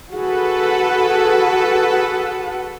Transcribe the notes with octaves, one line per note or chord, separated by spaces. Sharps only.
F#4 G#4 A4 B4 F#5